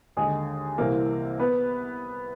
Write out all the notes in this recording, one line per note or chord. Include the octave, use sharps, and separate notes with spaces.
D#2 D3 G#3 G#4
C2 C3 E3 A#3 A#4
B3 B4